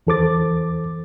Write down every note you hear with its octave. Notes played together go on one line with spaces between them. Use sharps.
E2 E3 A4 C5 D6 A6